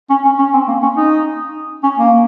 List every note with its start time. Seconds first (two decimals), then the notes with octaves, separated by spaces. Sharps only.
0.10 C#4
0.24 C#4
0.39 C#4
0.53 C4
0.68 A#3
0.82 C#4
0.97 D#4
1.83 C#4
1.98 A#3